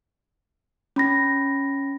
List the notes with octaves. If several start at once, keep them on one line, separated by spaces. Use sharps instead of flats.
C#4 B5 A#6